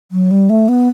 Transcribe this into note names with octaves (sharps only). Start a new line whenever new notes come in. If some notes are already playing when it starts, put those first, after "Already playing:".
F#3
G3
A3
B3